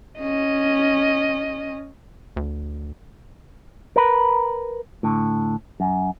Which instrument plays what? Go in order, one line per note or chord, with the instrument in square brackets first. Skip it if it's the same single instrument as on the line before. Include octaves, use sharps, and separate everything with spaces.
[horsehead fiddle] C#4 D#5
[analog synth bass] D2
[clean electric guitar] A#4 B4
A2 D3
F#2